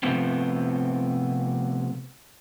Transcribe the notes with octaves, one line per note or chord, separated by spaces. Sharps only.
C3 F3 A3 B3 C4